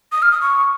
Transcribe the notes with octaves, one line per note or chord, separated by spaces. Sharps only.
D#6
F6
D#6
C#6